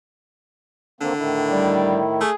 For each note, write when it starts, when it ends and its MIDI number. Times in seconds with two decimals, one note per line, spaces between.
1.01 2.01 50
1.01 1.13 51
1.01 1.13 58
1.01 1.13 60
1.18 2.22 45
1.18 2.22 51
1.18 2.22 64
1.50 2.00 55
2.21 2.31 57
2.21 2.34 68